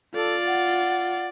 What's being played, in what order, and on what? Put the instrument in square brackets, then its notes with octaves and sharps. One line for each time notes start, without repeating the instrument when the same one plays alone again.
[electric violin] F4 D5 [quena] A4
[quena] F#5